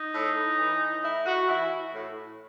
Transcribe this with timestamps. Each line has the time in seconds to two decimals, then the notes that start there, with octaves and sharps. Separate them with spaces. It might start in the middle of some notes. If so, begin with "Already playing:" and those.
Already playing: D#4
0.14 A2
0.58 E3
1.03 A2 E4
1.26 F#4
1.47 E3 E4
1.93 A2